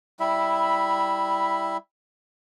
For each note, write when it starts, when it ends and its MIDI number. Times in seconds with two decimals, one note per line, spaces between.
0.20 1.77 55
0.20 1.77 64
0.20 1.77 76
0.20 1.77 83